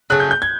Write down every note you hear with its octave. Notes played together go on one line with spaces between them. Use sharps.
C#3 F#3 A3 C#4 F#6
G6
G6
G#6